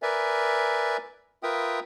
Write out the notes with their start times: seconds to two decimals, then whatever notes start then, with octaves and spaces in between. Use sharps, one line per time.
0.02 A#4 B4 D5 E5 G#5
1.43 F4 A#4 B4 E5 G5 D#6